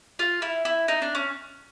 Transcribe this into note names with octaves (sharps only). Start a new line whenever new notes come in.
F4
E4
E4
D#4
D4
C#4